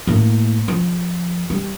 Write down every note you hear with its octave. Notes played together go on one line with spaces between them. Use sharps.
A2 A#3
F3
G3